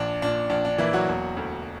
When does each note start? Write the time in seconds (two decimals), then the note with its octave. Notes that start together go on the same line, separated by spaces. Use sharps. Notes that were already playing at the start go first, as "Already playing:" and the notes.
Already playing: A#1 D4
0.22 A#2 D4
0.50 A#1 D4
0.65 D4
0.78 E3 A#3 E4
0.93 F#3 F#4
1.08 E1
1.37 D2